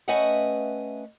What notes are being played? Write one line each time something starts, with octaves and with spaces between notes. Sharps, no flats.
A3 C#4 B4 D#5 E5 F#5